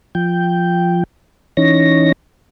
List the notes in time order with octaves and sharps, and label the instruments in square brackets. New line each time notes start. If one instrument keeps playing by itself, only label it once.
[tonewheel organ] F3 G5
E3 C#4 D#4 C#5 A#6